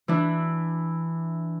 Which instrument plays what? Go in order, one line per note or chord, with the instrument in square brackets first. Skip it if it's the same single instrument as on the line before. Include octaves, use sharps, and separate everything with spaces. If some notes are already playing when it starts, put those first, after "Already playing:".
[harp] E3 D4 E4